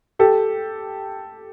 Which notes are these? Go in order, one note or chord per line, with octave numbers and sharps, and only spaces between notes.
G4 A4